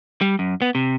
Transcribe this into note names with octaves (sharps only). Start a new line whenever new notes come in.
G3
F#2
B3
C3